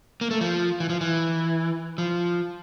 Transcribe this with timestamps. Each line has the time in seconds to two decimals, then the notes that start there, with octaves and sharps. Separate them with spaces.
0.21 A#3
0.31 A3
0.41 F3
0.80 E3
0.90 F3
1.01 E3
1.98 F3